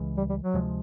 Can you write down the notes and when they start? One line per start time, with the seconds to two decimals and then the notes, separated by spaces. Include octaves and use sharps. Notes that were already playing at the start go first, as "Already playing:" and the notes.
Already playing: C#2 C#3 E3 G#3
0.17 G3
0.29 G3
0.43 F#3
0.54 D2 C3 F3 G#3